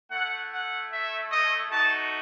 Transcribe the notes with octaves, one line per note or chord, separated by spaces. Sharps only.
A3 E4 F#5
F#5
E5
D#5
A3 D#4 F#4 A5